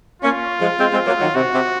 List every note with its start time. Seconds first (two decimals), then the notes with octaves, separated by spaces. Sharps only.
0.22 A#3 C#4 F4
0.61 F3 G#3
0.79 G#3 C4
0.92 G#3 C4
1.07 F#3 A#3
1.20 D#3 F#3
1.35 C3 F#4
1.53 C3